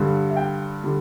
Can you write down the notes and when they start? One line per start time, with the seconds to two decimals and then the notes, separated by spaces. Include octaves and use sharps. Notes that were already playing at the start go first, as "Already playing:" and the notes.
Already playing: G2 D3 G3
0.30 E5
0.36 G5
0.84 D3 G3